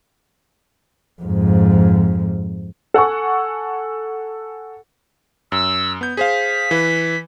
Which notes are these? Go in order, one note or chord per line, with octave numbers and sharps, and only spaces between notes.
F2 G#2
A4 F#5 G#5 C#6
F#2 E6
B3 G6
G#4 C5 F5 B6
E3 B4